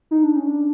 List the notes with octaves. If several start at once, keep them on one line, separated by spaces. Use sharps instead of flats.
D#4
D4
C#4
D4